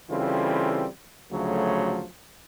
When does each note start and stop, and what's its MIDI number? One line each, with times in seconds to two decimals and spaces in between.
0.10 0.86 49
0.10 0.86 52
0.10 0.86 55
0.10 0.86 60
0.10 0.86 65
0.10 0.86 69
1.32 2.03 38
1.32 2.03 49
1.32 2.03 53
1.32 2.03 54
1.32 2.03 57